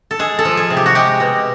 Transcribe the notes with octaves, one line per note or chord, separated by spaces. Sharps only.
A4
G#3 G#4
A4
F3
G#4
C3
G4
F#4
G#3 G4
B2